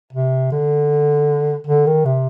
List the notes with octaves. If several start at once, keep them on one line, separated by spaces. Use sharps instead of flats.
C3
D3
D3
D#3
C3